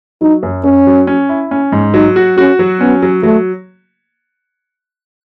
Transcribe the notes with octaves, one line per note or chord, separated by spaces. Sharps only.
F#3 D#4
F#2
F#2 C#4
F#3
C#4
E4
C#4
G#2
F#3 D#4
F#4
C#4 F#4
F#3
B3 C#4
F#3
F#3 A3